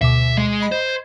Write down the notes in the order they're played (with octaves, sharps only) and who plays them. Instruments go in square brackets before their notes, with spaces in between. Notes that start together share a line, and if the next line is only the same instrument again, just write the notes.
[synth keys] D2 B2 D6 [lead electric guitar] E5
[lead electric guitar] G#3
[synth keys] D#5 B5
[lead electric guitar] C5
[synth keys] G#6